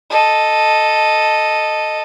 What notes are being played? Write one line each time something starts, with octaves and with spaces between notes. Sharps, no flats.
A4 D#5